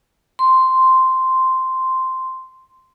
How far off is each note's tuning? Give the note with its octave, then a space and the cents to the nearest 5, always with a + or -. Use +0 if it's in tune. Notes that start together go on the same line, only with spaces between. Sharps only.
C6 -5